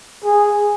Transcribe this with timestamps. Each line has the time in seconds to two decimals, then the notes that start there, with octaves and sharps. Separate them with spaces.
0.24 G#4